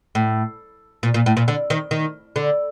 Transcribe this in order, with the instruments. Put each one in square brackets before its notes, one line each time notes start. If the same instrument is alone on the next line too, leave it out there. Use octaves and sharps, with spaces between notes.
[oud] A2
A#2
A#2
A2
A#2
D3
D#3
D#3
D3